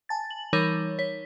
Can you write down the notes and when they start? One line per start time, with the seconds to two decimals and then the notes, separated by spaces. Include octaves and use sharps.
0.09 G#5 A5 A6
0.30 F#7
0.53 E3 G3 D#4 A#4 C#5
0.99 C#5 B6